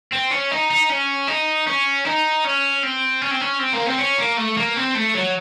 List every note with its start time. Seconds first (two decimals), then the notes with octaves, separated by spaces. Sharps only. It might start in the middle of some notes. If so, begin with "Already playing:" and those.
0.13 C4
0.31 C#4
0.52 D#4
0.71 D#4
0.90 C#4
1.28 D#4
1.67 C#4
2.05 D#4
2.44 C#4
2.83 C4
3.22 C#4
3.31 C4
3.41 C#4
3.60 C4
3.73 A#3
3.87 C4
3.98 C#4
4.18 A#3
4.37 A3
4.57 A#3
4.76 C4
4.95 A3
5.15 F#3